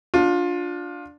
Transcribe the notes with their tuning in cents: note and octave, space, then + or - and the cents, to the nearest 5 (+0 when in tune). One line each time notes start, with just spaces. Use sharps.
D4 +0 F4 +20